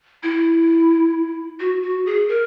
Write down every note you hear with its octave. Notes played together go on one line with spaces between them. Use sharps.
E4
F#4
F#4
G#4
A#4